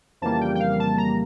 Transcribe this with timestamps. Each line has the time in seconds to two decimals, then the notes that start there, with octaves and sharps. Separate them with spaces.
0.21 F2 C#3 E3 G3 A#3 A5
0.41 G5
0.55 G5
0.60 F5
0.80 A5
0.98 A#5